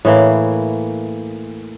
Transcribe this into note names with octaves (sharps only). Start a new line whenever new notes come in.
A2 E3 A#3